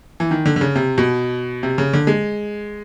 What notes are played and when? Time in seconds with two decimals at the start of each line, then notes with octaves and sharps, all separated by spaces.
0.20 E3
0.31 D#3
0.46 D3
0.56 D3
0.61 C#3
0.75 C3
0.98 B2
1.63 C3
1.78 C#3
1.93 D3
2.07 G#3